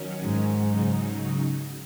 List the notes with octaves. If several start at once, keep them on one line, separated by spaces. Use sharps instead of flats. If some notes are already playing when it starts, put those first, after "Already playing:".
Already playing: D#3 F#3 C#4
G#2
C#3 F#3 D#4